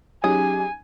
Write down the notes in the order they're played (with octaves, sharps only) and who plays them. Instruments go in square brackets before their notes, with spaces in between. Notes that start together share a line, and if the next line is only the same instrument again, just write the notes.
[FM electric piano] F#3 C#4 D#4 [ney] G4 [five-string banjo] G#4 [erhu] G#5